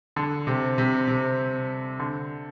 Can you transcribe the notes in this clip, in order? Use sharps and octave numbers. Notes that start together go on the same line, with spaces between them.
D3
C3
C3
C3
D3